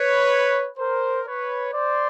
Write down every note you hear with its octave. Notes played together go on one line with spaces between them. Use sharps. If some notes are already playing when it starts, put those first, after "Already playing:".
Already playing: B4 C#5
A#4 C5
B4 C#5
C5 D5